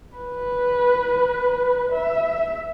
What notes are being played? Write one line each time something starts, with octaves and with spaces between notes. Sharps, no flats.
B4
E5